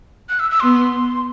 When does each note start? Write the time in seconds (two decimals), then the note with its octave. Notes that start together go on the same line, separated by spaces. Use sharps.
0.29 F#6
0.40 E6
0.51 E6
0.61 B3 C6